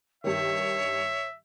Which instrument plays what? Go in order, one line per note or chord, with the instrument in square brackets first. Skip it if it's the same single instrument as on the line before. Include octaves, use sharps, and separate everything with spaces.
[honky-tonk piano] G2 D#3 [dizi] C#5 [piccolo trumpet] E5